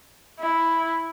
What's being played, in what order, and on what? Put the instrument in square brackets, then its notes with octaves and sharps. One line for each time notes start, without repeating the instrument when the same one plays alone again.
[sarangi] E4